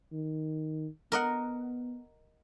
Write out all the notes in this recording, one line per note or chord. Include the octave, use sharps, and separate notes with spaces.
D#3
B3 A#4 D#5 F#5